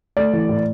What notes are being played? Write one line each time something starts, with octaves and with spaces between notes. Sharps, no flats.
A3 D5
E3
A2